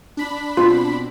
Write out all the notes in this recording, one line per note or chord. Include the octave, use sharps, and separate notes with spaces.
D4 B5
B2 C4 F4